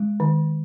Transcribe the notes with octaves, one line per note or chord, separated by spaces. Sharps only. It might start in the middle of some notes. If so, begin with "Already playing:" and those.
Already playing: G#3
D#3